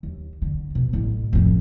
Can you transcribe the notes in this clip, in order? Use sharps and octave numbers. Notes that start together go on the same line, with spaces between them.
D#2
D3
B2
A1 E3
A1 F2